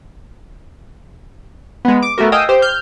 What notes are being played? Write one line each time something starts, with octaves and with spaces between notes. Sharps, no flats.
G#3 B3
D6
A3 B3 F#4 A#4
D#5 F5 G5 G#5 D#6 E6
G4 C5
F6 G6